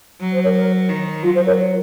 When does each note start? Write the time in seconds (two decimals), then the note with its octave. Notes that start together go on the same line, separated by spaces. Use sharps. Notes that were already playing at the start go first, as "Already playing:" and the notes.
0.20 F#3
0.33 C5
0.44 A#4 C#5
0.55 A#4
0.89 D#3
1.23 F#3 F4
1.35 C5
1.46 A#4 C#5